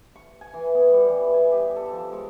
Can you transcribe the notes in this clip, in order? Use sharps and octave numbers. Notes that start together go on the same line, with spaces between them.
C#6
G#5
E3
B3
G3
E3
G#5
G4
A4
F3
G#3